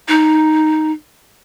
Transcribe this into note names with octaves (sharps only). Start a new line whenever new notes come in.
D#4